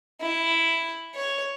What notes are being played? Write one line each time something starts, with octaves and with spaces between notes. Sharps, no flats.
E4
C#5